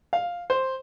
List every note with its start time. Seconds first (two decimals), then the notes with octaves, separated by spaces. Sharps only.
0.13 F5
0.50 C5